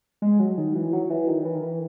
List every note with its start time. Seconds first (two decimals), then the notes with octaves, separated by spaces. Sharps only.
0.22 G#3
0.39 F#3
0.58 D#3
0.76 E3
0.93 F#3
1.10 E3
1.28 D#3
1.45 E3
1.55 D#3
1.63 E3